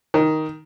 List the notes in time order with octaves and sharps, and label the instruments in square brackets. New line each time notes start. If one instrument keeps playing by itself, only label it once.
[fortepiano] D#3